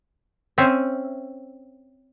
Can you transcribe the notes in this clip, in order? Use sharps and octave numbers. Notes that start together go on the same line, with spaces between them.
C4 C#4 E5